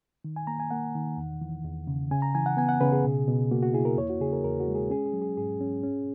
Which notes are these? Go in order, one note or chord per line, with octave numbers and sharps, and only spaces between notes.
D#3
G#5
A#3 A#5
G#5
A#3 F#5
D#3
E2
E3
E2
C#3
C#3 G#5
A#5
E3 G#5
F#5
B3 G#5
F#5
C#3 B4
G#4
B2
B2
A#3 F#4
F#4
E4 G#4
A#4
E2 C#5
F#4
C#3 G#4
A#4
E2 A#4
F#4
G#3
G#4
C#4 G#4
G#4
F#3
G#4
G#2 G#4
C#4
C#4